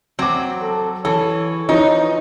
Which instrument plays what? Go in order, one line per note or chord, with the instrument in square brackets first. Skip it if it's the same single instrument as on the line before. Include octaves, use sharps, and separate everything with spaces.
[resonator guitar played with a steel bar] F#3 [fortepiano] C4 D6
[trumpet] A4
[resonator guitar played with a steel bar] E3 [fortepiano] A4 [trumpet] C#5
[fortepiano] E3 F3 [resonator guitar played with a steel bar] D#4